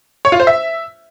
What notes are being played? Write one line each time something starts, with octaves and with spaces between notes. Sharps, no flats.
C#5
F4
C5
E5